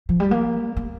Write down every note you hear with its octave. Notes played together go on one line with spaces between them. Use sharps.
F3
G3
A#3
A#3